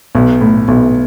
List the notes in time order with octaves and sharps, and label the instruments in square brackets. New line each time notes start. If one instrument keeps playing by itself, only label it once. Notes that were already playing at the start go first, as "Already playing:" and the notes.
[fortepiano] B1
A2
B1